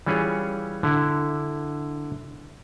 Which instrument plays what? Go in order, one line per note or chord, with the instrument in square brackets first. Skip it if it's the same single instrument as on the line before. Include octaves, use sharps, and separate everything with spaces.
[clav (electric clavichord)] E3 G3 C#4 F4 G#4 C#5
D3 E4